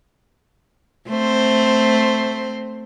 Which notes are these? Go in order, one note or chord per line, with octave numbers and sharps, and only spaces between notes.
A3 C4 C5